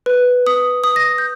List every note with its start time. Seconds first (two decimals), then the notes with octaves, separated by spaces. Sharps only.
0.06 B4
0.47 D#6
0.84 D#6
0.96 A#6
1.18 G6